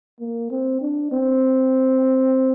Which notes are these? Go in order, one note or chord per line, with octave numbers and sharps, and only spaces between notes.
A#3
C4
D4
C4